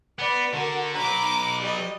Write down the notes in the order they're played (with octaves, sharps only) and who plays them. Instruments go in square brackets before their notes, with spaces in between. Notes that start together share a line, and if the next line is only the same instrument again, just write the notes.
[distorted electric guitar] B3 [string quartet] B4 D5
[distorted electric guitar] D3 [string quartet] F#4 A#4
[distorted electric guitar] F#3 B4 [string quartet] A#5 D6
[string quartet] G3 D#5